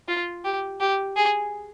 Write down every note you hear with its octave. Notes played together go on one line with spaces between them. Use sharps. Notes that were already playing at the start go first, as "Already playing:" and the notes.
F4
G4
G4
G#4